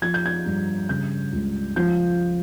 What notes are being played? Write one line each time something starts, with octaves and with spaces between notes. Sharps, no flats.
F3 G#6
G6
G#6
G2
C#3 G6
C#2
F3 G6